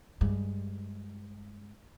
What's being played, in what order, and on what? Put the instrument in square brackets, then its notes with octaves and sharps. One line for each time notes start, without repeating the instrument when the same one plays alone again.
[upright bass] G2 G#3